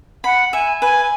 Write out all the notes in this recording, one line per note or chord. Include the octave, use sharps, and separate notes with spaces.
F#5 B5
E5 G#5
B4 G#5